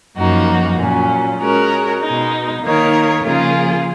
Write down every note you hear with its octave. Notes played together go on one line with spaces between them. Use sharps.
F#2 F3 A#3 D#4 F#4
A#2 F#3 C#4
G#3 C#4 F#4 A#4 C#5
B2 G#3 D#4
D#3 A#3 D#4 A#4 C#5
C#3 F3 A#3 F4 G#4